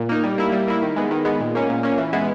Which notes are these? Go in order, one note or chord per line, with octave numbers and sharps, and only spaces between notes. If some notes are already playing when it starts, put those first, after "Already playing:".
Already playing: A#2
A#3 D#4
G3
A#3 E4
G3
A#3 E4
D#3
G#3 B3
D#3
G#3 B3
A#2
A#3 C#4
A#2
A#3 C#4
E3
G#3 B3 E4